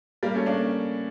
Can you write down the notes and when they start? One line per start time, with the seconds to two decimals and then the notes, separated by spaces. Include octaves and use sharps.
0.23 G3 A#3
0.35 A3 C#4
0.46 A#3 D4